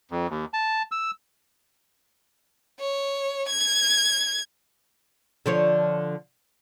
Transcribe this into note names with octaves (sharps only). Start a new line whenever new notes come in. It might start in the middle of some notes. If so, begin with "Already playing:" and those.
F2
D#2
A5
E6
C#5
G#6
D3 F3 C#5